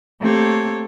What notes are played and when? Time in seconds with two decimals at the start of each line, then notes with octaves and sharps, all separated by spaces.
0.21 A3 A#3 C4 G4 A4 C#5